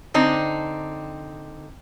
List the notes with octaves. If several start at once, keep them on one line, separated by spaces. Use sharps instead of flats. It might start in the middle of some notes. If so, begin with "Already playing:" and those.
D3 C4 D#4